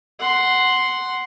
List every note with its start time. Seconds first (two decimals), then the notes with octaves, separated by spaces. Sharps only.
0.19 F#5 C6